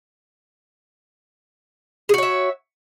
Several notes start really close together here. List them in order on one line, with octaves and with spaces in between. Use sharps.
G#4 F#4 C#5 E5